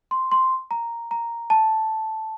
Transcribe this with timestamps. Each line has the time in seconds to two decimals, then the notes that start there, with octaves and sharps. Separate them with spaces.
0.11 C6
0.32 C6
0.71 A#5
1.11 A#5
1.50 A5